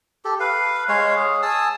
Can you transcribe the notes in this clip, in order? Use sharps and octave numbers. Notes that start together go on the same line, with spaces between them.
G4 A4
B4 F5
G#3 C#5 F5
G#4
G#5 A5 D#6 E6